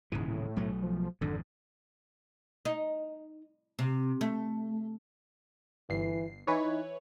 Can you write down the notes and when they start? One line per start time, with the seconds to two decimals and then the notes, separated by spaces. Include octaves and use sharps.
0.12 D#1 G#2 C#3 E3
0.28 A2
0.56 B1 F#3 A3
0.83 F3
1.21 G#1 F2 G#2 D3
2.65 D#4
3.79 C3
4.21 A3
5.90 G1 E3 C7
6.47 E3 D#4 B4 C#5